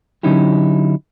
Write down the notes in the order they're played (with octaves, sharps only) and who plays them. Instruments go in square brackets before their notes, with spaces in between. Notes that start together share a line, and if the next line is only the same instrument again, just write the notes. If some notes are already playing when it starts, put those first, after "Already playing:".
[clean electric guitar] D3 F#3 C#4 D#4 E4 G4